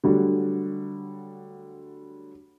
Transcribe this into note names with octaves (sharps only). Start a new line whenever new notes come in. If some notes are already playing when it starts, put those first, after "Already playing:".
D3 F#3 G3 A3 F#4